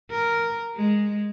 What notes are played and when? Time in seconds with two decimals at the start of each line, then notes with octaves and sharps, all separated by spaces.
0.11 A#4
0.76 G#3